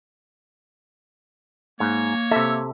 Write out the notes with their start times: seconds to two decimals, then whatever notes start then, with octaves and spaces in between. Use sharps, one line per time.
1.80 G#2 A#3 C#5
2.31 C3 A4 E5